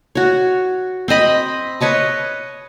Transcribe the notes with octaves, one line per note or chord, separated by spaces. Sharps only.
F#4 C#5
C4 C5 D#5 B5
B4 C#5 D#5 A5